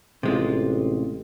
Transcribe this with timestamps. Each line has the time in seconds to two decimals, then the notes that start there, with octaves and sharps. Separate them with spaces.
0.23 A1 C3 G#3 F4